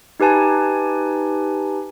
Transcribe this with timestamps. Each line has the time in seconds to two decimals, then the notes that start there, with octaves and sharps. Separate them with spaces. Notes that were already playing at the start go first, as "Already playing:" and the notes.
0.20 D#4 G4 B4 G#5 A5